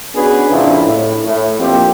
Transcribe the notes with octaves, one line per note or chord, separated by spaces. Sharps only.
B3 C#4 D4 F#4 G#4 B4
A#1 F2 C#3 D4 E4
A2
A2
A#1 F2 A#3 C4 G4